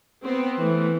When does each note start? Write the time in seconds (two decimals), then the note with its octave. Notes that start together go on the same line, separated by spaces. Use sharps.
0.24 B3 C4
0.60 E3 A3